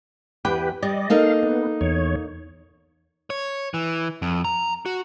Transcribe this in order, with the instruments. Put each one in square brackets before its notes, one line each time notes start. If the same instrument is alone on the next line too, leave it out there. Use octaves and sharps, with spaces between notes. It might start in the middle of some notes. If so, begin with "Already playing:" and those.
[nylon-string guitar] E2 G5 [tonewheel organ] G4 B4
[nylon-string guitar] G3 [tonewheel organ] D5 D#5
[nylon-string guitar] A#3 D#4 A4 [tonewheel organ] F5
[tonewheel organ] B3
E2 C#5
[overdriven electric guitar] C#5
E3
F2
A#5
F#4